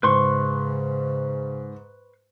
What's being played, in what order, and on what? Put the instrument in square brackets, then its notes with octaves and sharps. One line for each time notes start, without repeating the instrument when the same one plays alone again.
[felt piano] G#2 [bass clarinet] C#3 [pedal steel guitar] B4 C6 C#6